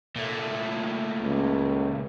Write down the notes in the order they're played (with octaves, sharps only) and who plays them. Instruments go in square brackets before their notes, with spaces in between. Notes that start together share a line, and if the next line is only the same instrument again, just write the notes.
[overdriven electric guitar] A#2 A3
[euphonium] C#2